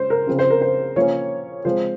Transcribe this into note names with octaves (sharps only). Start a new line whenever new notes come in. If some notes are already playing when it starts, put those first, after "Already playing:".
Already playing: G#3 C#4 C5
A#4
C#3 F3 C4
C5
A#4
C5
F3 A#3 C#4 C#5
F3 G#3 C4 C5